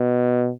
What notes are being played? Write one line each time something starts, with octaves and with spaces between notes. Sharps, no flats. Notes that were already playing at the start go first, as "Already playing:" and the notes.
Already playing: B2